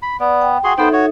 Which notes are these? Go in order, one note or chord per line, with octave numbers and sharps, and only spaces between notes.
B5
B3 D5
G5
F#4 G#4 C6
B3 D#4 A4 C5 E5 G5
F#4 C#5